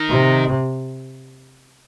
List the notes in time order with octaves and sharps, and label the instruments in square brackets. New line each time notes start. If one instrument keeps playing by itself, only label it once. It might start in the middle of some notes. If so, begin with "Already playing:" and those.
Already playing: [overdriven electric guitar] D#3
[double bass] C3